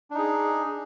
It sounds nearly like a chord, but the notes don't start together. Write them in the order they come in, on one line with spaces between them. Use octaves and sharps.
D4 D#4 G#4